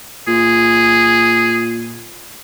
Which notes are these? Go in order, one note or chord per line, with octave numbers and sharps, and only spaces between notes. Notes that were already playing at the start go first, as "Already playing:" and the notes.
A#2 G#4